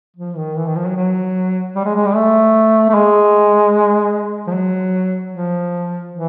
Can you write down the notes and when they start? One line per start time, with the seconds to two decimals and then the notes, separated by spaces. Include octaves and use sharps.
0.17 F3
0.36 D#3
0.56 E3
0.67 D#3
0.75 F3
0.86 F#3
0.96 F#3
1.75 G3
1.85 G#3
1.95 G#3
2.05 G3
2.15 A3
2.89 A3
2.94 G#3
4.47 F3
4.53 F#3
5.32 F3
6.12 E3